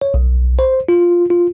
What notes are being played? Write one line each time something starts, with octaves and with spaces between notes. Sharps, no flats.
C#5
B1
C5
F4
F4